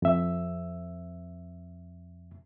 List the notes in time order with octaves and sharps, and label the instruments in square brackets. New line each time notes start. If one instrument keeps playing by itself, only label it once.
[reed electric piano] F2 E5